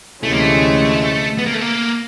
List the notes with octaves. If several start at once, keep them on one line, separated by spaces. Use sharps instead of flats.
D2 C3 E3 G#3 A3 C#4
A#3
A3
B3
A#3
A3
A#3